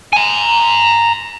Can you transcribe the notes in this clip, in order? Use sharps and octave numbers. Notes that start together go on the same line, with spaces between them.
G#5 A#5